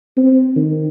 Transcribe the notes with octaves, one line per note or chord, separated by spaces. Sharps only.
C4
D#3